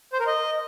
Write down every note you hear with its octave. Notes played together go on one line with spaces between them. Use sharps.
C5
A#4
D#5